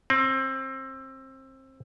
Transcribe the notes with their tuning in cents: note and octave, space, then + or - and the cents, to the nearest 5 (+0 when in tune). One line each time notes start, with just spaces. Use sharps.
C4 +25